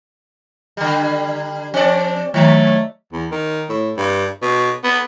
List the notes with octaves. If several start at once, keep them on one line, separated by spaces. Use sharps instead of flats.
D3 G3
F3 C4 D4 D5
D#3 F#3 A3 C#5
E2
D#3
A2
G2
B2
B3